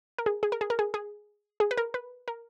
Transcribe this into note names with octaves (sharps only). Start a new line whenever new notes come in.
A#4
G#4
G#4
A#4
G#4
A#4
G#4
G#4
G#4
B4
A#4
B4
A#4